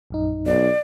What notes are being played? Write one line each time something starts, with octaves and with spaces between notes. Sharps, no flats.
A#1 F#2 D#4
B1 D5